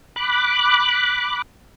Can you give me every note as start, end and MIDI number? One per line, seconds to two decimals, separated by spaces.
0.16 1.42 83
0.16 1.42 86
0.16 1.42 90